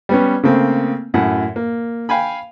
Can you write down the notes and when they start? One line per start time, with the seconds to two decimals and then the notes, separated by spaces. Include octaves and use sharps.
0.09 G3 B3 C#4
0.43 C#3 A3 A#3 C4
1.14 F#2 A2 F#5
1.56 A#3
2.09 F5 G5 G#5 B5